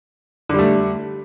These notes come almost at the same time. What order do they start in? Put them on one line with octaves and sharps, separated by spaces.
D3 G3 A3